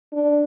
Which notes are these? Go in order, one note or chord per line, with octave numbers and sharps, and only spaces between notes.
D4